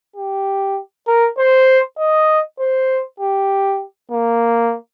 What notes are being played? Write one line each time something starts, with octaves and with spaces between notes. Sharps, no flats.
G4
A#4
C5
D#5
C5
G4
A#3